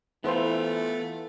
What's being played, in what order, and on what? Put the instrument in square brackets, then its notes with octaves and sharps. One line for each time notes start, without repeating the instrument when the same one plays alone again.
[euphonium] E3 [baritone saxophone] A3 [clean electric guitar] B3 F4 [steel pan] E4 C5